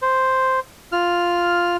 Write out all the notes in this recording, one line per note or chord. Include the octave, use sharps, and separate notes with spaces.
C5
F4 F6